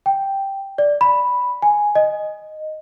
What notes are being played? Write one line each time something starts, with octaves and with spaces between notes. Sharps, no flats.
G5
D5
B5
G#5
D#5